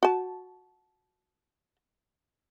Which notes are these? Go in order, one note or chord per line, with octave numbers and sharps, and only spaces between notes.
F#4 A5